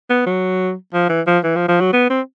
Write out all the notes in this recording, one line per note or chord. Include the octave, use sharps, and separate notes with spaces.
B3
F#3
F3
E3
F3
E3
F3
F3
F#3
B3
C4